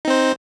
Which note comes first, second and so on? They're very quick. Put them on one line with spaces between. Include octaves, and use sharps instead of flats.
D#4 C4 C5